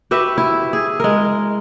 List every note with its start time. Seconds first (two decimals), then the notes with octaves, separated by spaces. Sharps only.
0.11 F#4 G4 B4 E5
0.38 E4
0.73 G#4
1.00 G#3 A#4